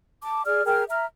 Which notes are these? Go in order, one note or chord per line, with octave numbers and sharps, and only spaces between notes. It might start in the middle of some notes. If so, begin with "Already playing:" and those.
A5 D6
G#4 D5 F6
G#4 A#4 G5 F6
E5 A#5 F6